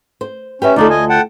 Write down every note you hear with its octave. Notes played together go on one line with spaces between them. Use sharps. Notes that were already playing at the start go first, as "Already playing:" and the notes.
C5
C#4 G4 B4 E5
D2 D#4 F4 A4 D5
D#5 G#5
F#5 G5 A5